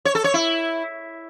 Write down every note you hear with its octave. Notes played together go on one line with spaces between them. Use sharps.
C#5
A4
C#5
E4